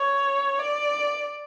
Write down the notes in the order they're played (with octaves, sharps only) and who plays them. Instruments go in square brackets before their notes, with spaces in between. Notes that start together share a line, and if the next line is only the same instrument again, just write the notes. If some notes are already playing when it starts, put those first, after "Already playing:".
Already playing: [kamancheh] C#5
D5